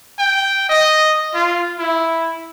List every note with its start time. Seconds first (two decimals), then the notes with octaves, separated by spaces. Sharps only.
0.19 G5
0.69 D#5
1.34 F4
1.78 E4